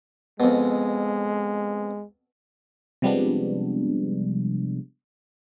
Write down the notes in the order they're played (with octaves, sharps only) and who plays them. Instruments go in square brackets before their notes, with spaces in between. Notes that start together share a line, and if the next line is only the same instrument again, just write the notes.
[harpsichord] F2 B2 [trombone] G#3
[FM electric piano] C3 F3 G3 G#3 B3 D4